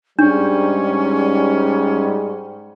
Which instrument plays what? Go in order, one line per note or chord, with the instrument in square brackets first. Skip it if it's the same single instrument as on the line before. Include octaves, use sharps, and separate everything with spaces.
[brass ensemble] G#2 G3 [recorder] C#4 [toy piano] D4